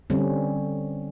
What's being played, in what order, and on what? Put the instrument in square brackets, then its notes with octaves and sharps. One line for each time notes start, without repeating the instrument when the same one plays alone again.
[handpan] D3 G3 C4 C#4